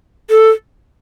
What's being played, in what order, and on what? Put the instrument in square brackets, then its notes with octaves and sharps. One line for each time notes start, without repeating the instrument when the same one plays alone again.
[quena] A4